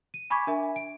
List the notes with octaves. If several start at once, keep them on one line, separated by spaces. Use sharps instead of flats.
D#7
G#5 B5 C#6 D6 G#6 B6
D4 A#4 E5 G#5
D7